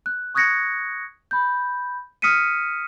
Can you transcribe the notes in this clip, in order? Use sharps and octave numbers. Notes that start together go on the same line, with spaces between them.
F#6
C#6 D#6 F#6 G#6 A#6 C#7
B5 G6
D#6 F6 B6 C#7 D#7